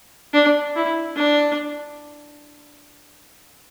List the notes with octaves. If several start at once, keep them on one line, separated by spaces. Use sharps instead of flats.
D4
E4
D4